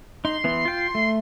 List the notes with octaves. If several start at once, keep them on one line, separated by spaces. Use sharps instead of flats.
D#4 C6
E3 B3
F4 G5
A3